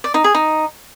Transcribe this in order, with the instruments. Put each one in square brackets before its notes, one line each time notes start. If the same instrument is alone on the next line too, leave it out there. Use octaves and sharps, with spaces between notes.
[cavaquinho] D5
D#4
G#4
D#4